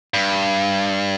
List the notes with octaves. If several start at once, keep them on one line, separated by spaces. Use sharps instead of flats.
G2